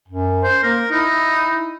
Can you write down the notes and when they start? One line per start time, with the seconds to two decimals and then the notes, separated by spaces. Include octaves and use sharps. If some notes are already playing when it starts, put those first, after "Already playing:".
0.08 F#2
0.44 C5
0.63 A#3 A#4
0.91 D#4 E4